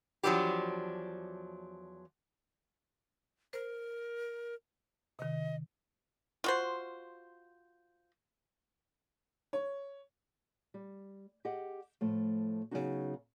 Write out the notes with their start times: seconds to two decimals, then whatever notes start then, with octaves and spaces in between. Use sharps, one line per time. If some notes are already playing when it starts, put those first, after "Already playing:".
0.23 E2 F3 F#3 C4 D4 G4
3.53 A#4 C5
5.19 C3 D#3 D#5
6.44 F4 F#4 C5
9.53 C#5
10.74 G3
11.45 G4 G#4 D#5 F#5
12.01 A2 F3 A3
12.71 C#3 F3 F#3 B3 D#4 F#4